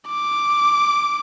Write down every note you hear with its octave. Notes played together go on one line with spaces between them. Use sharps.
D6